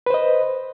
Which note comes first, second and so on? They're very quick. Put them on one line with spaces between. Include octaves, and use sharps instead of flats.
B4 C5 D#5